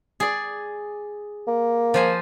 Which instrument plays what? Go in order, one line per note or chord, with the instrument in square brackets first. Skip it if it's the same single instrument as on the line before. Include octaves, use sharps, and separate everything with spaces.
[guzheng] G#4 D5
[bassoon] A#3
[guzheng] F3 C5 G#5